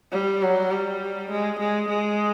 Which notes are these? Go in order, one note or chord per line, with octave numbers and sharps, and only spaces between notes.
G3
F#3
G3
G#3
G#3
G#3